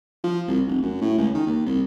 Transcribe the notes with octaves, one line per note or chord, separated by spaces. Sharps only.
F3
C2
F1
F#2
A2
C#2
D#3
D#2
C2